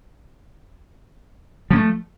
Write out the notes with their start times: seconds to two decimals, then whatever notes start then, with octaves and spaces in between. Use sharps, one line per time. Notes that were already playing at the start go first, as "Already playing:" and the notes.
1.71 F3
1.73 A#3
1.76 A3